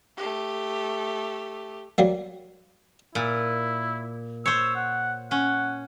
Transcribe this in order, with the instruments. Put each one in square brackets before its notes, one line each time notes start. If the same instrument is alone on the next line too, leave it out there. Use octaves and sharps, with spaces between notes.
[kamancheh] A3 G4
[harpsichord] F#3 G3 A#3
[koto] A#2 [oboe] E4
[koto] C5 C#5 [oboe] E6
[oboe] F#5
[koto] C#4 [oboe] F#5